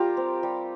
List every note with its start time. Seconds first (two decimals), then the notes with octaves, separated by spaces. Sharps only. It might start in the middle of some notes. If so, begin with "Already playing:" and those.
Already playing: G3 F4 G4 A#4
0.17 C4
0.43 G3